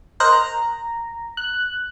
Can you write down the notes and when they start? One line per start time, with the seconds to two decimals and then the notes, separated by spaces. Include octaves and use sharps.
0.20 A#4 C5 D#5 C6 F#6 A#6
0.33 A#5
1.37 F#6